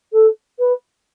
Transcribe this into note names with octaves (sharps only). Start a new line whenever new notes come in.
A4
B4